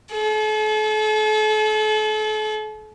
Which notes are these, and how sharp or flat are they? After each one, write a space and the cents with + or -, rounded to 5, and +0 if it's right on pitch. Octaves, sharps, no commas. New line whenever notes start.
A4 -40